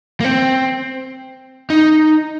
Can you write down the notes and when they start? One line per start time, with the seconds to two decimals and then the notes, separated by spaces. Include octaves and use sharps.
0.20 A#3
0.25 C4
1.70 D#4